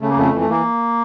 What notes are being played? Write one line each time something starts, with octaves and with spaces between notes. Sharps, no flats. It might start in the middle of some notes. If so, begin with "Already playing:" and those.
C#3 A3
A#3
F2 A3
E3
A3
E3 A#3